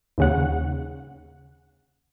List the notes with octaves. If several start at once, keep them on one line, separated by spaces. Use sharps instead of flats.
D#2 C#3 F#5